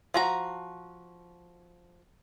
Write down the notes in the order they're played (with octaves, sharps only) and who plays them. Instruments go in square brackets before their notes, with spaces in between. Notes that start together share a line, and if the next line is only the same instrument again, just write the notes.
[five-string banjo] F3 F#4 A#5